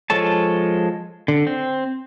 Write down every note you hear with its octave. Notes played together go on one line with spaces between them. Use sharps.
F3 G#3 A4 C#5 A5
D3
C4